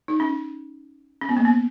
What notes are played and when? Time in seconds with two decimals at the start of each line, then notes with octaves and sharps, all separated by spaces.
0.08 D#4
0.20 C#4
1.21 C#4
1.29 B3
1.37 A#3
1.45 B3